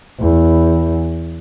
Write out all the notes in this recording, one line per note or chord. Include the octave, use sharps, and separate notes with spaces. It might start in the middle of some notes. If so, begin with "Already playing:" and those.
E2